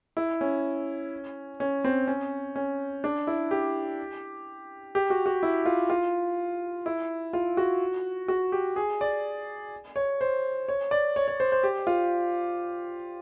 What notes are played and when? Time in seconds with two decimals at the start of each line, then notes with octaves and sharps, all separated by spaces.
0.17 E4
0.41 C#4
1.60 C#4
1.84 C4
2.08 C#4
2.56 C#4
3.04 D4
3.27 E4
3.51 G4
4.95 G4
5.10 F#4
5.26 F#4
5.43 E4
5.66 F4
5.90 F4
6.86 E4
7.33 F4
7.57 F#4
8.28 F#4
8.52 G4
8.76 G#4
9.01 D5
9.96 C#5
10.21 C5
10.69 C#5
10.91 D5
11.16 C#5
11.28 C#5
11.40 C5
11.52 C5
11.63 G4
11.87 F4